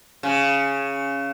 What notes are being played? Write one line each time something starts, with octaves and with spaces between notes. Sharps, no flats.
C#3